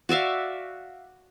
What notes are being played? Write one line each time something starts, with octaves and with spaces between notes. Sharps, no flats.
F#4 D5 E5 F5